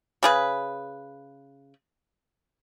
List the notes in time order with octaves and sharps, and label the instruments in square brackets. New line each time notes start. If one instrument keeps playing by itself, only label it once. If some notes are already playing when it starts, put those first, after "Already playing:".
[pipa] C#3 G#4 B4